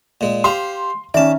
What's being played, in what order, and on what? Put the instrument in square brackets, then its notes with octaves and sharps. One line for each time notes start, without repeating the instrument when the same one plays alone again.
[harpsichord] A#2 G#3
[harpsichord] G4 C5 F5 [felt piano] C6
[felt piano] D#3 C#4 [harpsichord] D5 A5 [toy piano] E5